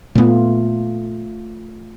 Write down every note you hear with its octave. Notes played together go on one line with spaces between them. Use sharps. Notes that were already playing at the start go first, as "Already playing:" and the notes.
A#2 A3 B3 F4